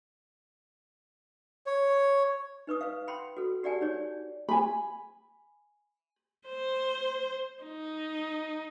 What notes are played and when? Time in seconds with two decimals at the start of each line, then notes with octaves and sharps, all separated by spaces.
1.66 C#5
2.67 D#4 B4 C#6 D#6
2.81 B4 F5
3.07 F#5 G5 B5 C6
3.37 F#4 A4
3.63 F#4 G4 D5 F#5 G#5 A5
3.81 D#4 G#4 C#5 D5
4.49 G#5 B5
6.47 C5
7.64 D#4